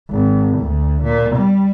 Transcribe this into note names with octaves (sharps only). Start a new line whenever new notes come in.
G#1
D2
A#2
G3